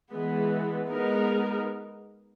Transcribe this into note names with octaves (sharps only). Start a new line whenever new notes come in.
E3 G#3 B3
G#3 B3 D#4 A#4